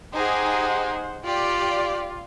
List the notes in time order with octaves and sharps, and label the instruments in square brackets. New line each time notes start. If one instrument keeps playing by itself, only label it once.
[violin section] D#4 G4 G#4 [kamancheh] C5 F#5
[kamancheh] F4 [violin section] G4 D5